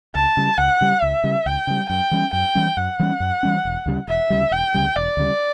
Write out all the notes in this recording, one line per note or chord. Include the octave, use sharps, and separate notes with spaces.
C#2 A5
C#3 G3
C#2 F#5
C#3 G3
C#2 E5
C#3 G3
C#2 G5
C#3 G3
F#2 G5
E3 G3 C#4
F#2 G5
E3 G3 C#4
F#2 F#5
E3 G3 C#4
F#2
E3 G3 C#4
E1
D2 C#3 G3
E1 E5
D2 C#3 G3
E1 G5
D2 C#3 G3
E1 D5
D2 C#3 G3